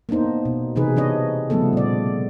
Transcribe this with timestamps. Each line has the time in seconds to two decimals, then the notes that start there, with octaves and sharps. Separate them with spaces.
0.09 A#3 B3 D4 D#4 C5
0.45 B2
0.76 C3 E3 D#4 G#4 B4
0.96 E3 C4 D4 C#5 D#5
1.50 C#3 F3 G3 A3 B3 A4
1.73 A#2 D5